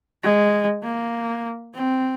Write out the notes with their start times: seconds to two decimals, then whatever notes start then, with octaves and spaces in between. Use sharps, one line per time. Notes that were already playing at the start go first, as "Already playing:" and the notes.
0.23 G#3
0.84 A#3
1.74 C4